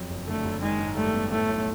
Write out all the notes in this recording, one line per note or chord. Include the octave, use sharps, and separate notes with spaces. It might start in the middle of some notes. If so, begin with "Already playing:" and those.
Already playing: F2 F#3
F#1
D3 A3
F#1
D#3 G#3
G#2
G3 A3
B3
A2 A3
B1